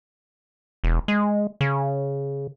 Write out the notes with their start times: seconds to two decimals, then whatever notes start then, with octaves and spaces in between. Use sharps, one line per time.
0.84 E1
1.08 G#3
1.61 C#3